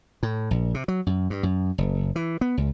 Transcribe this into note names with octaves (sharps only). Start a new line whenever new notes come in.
A2
A#1
C3
F#3
F#2
G2
F#2
F#1
E3
B3
C#2